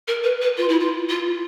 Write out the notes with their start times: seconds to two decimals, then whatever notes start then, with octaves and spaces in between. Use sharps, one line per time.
0.08 A#4
0.24 B4
0.42 B4
0.58 F4
0.69 E4
0.80 F4
1.09 F4